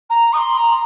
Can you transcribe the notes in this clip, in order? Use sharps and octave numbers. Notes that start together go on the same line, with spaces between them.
A#5
D#6
C6
A#5